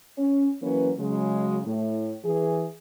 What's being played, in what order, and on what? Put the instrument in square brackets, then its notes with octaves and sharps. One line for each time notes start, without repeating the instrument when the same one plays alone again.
[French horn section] C#4
E3 F#3 A#3 C#4 B4
C#3 F#3 G#3
A2
E3 G#4